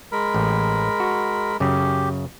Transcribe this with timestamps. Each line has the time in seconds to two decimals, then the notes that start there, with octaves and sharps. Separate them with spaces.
0.12 G#3 A#4 B5
0.34 A1
1.00 F#4
1.60 F#2 C#3 G4